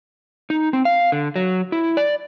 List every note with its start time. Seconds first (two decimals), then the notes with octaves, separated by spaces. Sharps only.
0.50 D#4
0.73 C4
0.85 F5
1.12 D3
1.36 F#3
1.72 E4
1.97 D5